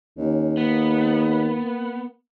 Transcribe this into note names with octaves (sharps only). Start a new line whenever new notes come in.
D#2 C#4
A#3 B3